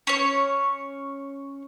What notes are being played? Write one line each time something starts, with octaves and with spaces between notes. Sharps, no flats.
C#4 C#5